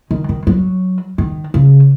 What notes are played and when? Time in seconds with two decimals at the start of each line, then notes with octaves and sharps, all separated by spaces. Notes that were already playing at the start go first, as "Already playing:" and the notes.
0.11 D#3
0.29 D#3
0.47 F#3
1.18 D#3
1.54 C#3